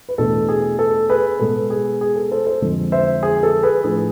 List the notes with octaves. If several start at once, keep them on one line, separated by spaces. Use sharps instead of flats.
B4
E2 B2 A3 D4 A4
G#4
A4
G#4 B4
B2 G#3 B3 A4
G#4
G#4
A4
A4 C5
A4 C5
F2 D3 G#3
C5 E5
G#4
A4
G#4 B4
A2 F3 A3 D4 G#4